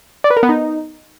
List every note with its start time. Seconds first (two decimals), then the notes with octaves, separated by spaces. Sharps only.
0.24 D5
0.30 B4
0.37 A#4
0.43 B3
0.49 D#4